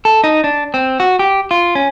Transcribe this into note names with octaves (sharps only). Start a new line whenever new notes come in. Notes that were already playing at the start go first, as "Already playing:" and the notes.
A4
D#4
D4
C4
F#4
G4
F4
C#4